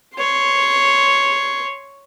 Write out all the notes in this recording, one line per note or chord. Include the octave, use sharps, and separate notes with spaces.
C#5 C6